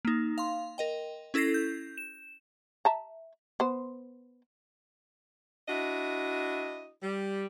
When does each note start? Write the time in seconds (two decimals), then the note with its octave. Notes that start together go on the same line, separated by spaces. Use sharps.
0.05 A#3 D#4
0.38 F5 C6
0.78 A#4 D#5 G5
1.34 C#4 E4 A4 G#6 A#6 C7
1.54 G6
1.98 E7
2.85 E5 A5 A#5
3.60 B3 C5
5.69 D4 E4 F#4 D#5
7.02 G3